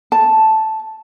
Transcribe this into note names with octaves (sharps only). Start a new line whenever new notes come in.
A5